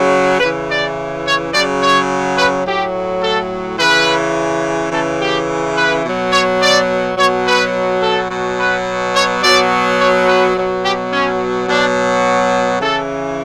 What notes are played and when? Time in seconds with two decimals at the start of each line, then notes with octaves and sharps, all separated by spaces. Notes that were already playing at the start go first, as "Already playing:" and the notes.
Already playing: C#3 F#3
0.40 C#3 E3 B4
0.68 D5
1.25 C#5
1.53 C#3 F#3 D5
1.81 C#5
2.37 B4
2.66 A2 F#3 G4
3.22 A4
3.78 C#3 E3 B4
4.91 C#3 E3 A4
5.20 G4
5.76 B4
6.04 B2 F#3
6.32 C#5
6.61 D5
7.17 B2 F#3 C#5
7.46 B4
8.02 A4
8.30 B2 F#3
8.58 B4
9.14 C#5
9.42 B2 F#3 D5
9.99 C#5
10.27 B4
10.55 B2 F#3
10.84 G4
11.11 C#4
11.68 B2 F#3 D4
12.81 C#3 E3 A4